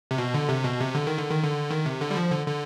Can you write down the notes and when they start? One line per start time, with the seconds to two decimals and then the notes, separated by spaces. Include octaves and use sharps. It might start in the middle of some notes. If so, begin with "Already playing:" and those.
0.11 C3
0.18 B2
0.34 D3
0.49 C3
0.64 B2
0.80 C3
0.95 D3
1.07 D#3
1.19 D3
1.31 D#3
1.43 D3
1.71 D#3
1.86 C3
2.01 D3
2.11 G3
2.17 F3
2.31 D3
2.47 D3